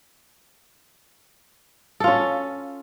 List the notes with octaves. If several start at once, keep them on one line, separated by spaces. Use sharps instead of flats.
C#4 F4 A4